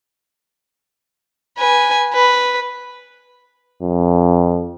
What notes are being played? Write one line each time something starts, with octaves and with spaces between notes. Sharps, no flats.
B4 G#5
B4
F2